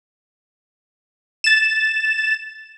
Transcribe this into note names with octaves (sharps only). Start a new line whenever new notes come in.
A6 E7